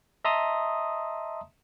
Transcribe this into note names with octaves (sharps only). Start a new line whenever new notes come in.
D#5 E5 A5 A#5 C6 D#6